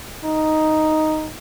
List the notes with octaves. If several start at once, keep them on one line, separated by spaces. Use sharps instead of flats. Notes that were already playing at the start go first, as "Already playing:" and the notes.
D#4